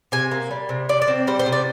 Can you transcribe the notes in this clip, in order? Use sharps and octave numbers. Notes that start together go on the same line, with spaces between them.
C3 G#5
A#3
G3
C3
C3 D5
D5
C4
G3 C5
C5
C3
D5